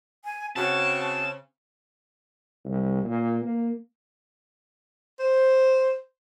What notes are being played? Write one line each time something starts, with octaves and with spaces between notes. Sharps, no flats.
G#5
C#3 C4 F#4 A5
C2
A#2
A#3
C5